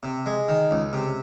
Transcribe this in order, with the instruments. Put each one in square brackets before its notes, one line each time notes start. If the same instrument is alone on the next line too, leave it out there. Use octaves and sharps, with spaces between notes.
[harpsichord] C3
G#3
D#3
C#2
C3